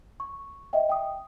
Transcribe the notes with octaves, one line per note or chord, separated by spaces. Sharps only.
C#6
D#5 E5 G5
G5 D#6